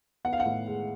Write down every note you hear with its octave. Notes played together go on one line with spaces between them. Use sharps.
B3 F#5
F5
F#5
A2
G#3